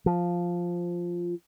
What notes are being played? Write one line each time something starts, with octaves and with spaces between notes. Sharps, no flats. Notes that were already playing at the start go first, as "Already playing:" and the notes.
F3